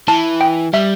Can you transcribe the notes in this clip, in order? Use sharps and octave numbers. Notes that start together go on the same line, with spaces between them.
E3 A5
G5
G3 E5